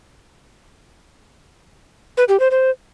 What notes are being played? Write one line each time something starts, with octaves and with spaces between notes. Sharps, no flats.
B4
G4
C5
C5